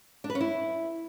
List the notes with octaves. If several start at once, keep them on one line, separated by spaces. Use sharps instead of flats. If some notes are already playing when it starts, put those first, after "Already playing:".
D4
B4
C#4
E4